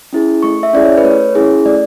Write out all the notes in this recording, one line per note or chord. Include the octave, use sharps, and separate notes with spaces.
C#4 E4 G#4
A3 C#6
E5
C#4 E4 G#4 D5
C#5
B4
A3 C#5
C#4 E4 G#4
A3 D5